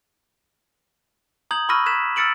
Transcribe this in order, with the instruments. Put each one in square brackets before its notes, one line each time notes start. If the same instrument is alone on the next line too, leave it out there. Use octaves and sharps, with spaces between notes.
[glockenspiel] A#5 D#6 G6 G#6 F#7
B5 C#6 E6 F6 A#6 D#7
F#6 G#6 B6 E7
E6 F6 A6 C#7 D7 F#7